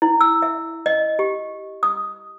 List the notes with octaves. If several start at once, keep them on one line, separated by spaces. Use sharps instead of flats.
E4
E6
E5
D#5
G4
D#6